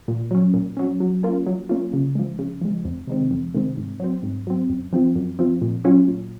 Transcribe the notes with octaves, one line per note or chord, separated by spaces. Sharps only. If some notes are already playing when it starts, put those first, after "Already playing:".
A#2
F#3 C#4
A#2
F#3 C#4
F#3
A#3 C#4 F4
F#3
A#3 C#4 F4
C#3
F3 G#3
C#3
F3 G#3
F2
C3 D#3 G#3 C4
F2
C3 D#3 G#3 C4
G#2
F#3 C4
G#2
F#3 C4
F#2
F3 C4 F4
F#2
F3 C4 F4
A#2
F#3 C#4 F4
A#2